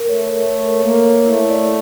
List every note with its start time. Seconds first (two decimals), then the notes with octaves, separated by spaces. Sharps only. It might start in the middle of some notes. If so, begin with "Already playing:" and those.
Already playing: A#4
0.08 A3 C#5
0.32 A3 C#5
0.56 A#4
0.79 A#3 C#5
1.02 C#5
1.26 A3 E4
1.49 D5